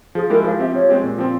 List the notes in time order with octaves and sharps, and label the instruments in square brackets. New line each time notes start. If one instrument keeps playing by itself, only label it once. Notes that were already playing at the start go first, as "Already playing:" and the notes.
[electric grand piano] F3 [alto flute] G#4
[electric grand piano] G#3 E4 G4 [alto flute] A#4
[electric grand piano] F3 [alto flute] F5
[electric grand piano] C4 G4 [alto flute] E5
[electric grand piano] F3 [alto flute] C#5
[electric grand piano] G#3 C4 G4
A#2
F3 C4